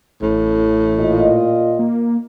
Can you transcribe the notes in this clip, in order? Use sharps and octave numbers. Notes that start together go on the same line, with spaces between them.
A1 A2
A#2 F4 D#5
A#3